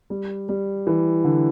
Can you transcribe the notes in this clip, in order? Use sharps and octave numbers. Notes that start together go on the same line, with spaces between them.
G3
G3
E3
D3